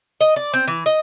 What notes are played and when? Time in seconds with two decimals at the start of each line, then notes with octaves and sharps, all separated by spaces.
0.21 D#5
0.36 D5
0.54 C4
0.68 E3
0.86 D#5